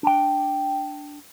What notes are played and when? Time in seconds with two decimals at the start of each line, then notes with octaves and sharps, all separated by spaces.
0.03 D4 G5